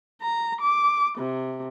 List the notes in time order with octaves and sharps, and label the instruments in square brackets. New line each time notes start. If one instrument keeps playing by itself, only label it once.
[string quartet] A#5
D6
C3